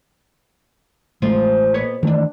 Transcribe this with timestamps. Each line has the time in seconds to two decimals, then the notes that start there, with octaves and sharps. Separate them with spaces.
1.22 A1 F3 G#3 A3 F4
1.74 A#2 B3 C#5
2.03 G2 D#3 E3 A3 D4